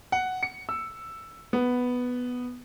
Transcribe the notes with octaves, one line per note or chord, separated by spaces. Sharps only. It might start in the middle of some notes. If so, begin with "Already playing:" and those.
F#5
C#7
E6
B3